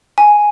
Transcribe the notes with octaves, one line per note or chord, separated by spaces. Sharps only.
G#5